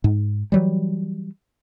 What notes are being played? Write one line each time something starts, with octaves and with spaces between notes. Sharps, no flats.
G#2
E3 F#3 G3